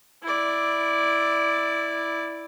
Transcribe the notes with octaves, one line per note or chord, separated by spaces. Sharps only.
E4 D5